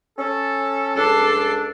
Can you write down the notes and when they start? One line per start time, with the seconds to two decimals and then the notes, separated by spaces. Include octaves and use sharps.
0.18 C#4 A4
0.97 C#2 D4 A4 C7